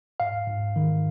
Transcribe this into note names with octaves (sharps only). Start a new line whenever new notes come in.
G#2 F5
G#2
D#3